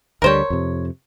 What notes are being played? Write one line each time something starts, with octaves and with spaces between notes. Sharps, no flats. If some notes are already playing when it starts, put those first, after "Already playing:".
D2 D3 G3 A#4 C5 C#5
F2 C3